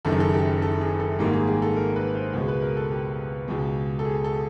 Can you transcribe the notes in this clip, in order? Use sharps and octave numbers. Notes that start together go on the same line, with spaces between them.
F#1 F#2 D#3 A4
G#4
A4
G4
A4
G#4
A4
G#1 G#2 D#3 G3 A#3 G4
G#4
G#4
A4
A#4
B4
C5
C#2 B2 G#3
B4
A#4
A4
G4
C#2 B2 G#3
A4
G#4
A4